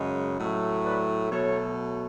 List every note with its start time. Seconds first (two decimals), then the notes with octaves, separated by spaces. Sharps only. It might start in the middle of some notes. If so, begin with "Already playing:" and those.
Already playing: F#2 C#3 G#3
0.38 A2 F#3 A3
0.84 B4 D5
1.30 B2 F#3 A3 A4 C#5